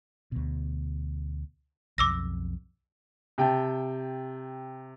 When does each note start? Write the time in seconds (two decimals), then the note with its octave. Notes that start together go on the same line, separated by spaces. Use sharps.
0.32 D2 B2
1.98 B1 F2 D6 E6 A#6
3.38 C3 G5 A5